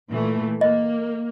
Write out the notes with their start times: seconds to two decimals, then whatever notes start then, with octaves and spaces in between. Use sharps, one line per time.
0.11 A#2 E3 A3
0.61 A#3 D#5